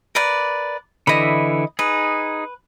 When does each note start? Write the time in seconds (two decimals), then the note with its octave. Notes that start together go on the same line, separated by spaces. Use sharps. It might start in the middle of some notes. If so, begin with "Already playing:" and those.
0.15 A#4 B4 D5
1.07 D3 E3 E4 D#5 B5
1.79 D#4 G#4 B4